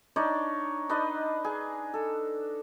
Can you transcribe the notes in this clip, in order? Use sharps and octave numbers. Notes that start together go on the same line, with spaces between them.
D4 D#4 C#5 D5
D4 D#4 B4 D#5
G#4
A4